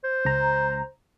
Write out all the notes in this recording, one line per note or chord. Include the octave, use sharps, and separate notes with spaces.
C5
C#2 A#5